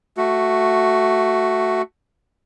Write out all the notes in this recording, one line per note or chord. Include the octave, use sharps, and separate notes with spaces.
A3 F#4